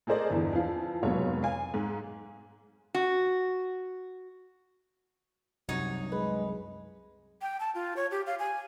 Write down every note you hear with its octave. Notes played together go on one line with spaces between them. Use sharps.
A3 G#4 A#4 C5 D5 D#5
G1 E2 E3
F2 E3 F5
F1 G#2 B2 F#3 A#3 C#5
F5 G#5
G#2
F#4
C2 F#2 C3 D#4 F#4 C#5
G#3 B4
G5
A5
F4
C#5
G4
F5
G#5